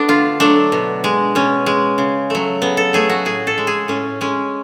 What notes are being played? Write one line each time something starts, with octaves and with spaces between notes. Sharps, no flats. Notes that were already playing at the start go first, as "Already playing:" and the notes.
Already playing: A3 B3 D4
D3 F4
F#3 A3 D4
B2
G#3
B2 C#4
G#3
C#3
F#3 A3
C#3 B3
A4
F#3 A3 G#4
F#4
A2 G#4
A4
G#3
G#4
A2 C#4
G#3 C#4